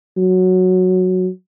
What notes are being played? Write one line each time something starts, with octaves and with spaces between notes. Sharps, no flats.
F#3